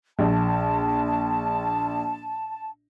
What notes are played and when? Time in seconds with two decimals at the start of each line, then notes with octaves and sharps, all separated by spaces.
0.19 A#1 A5